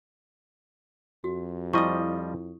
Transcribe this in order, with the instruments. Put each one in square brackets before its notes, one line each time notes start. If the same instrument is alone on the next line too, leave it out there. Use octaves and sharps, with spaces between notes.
[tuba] F2 [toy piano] F#4
[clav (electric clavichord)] F3 G3 D#5 [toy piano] E4 [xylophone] C#6 D#6